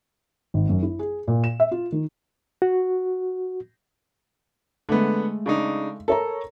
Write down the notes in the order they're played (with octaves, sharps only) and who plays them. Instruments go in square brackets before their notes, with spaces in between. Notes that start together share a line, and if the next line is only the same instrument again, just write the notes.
[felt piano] G#1
F#2
E4
G#4
A#2
E7
E5
F4
D#3
[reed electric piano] F#4
[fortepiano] D3 B3 [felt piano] G#3 A3
[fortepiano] C#3 D4 D#4
[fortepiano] A4 [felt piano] A#4 C#5 A#5